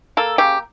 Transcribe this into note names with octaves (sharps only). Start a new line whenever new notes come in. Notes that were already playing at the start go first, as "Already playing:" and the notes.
A#3 A4
C#3 G4